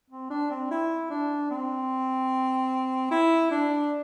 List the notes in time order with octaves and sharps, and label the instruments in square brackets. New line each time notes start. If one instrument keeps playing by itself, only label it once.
[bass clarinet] C4
D4
C4
E4
D4
C4
E4
D4